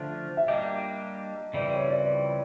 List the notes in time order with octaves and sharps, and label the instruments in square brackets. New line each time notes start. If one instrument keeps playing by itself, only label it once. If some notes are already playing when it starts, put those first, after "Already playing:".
Already playing: [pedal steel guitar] D3 F3 A3 D4 F4
[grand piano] E5
[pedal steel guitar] G3 A#3 D4 G4 [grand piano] D#5
[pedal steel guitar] C#3 E3 G3 C4 [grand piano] D5
[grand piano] C#5
D5